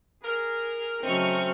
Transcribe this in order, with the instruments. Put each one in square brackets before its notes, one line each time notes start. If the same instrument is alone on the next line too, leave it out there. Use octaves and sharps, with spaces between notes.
[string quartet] G#4 [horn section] A#4
[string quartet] C#3 F#3 A3 [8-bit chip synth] C4 [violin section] D#5 C#6 F6